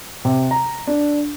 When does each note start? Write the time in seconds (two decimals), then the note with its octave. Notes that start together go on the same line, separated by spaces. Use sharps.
0.25 C3
0.51 A#5
0.87 D4